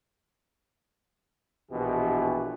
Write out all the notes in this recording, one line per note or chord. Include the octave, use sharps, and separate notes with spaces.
A#1 B2 E3 G4